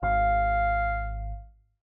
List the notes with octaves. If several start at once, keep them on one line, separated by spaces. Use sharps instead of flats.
G#1 F5